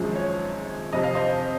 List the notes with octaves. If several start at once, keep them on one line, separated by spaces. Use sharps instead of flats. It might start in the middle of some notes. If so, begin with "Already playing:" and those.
Already playing: G#1 F#2 F3 G#3
C#5
F1 F2 C3 F3 D#5
F5
C5 D#5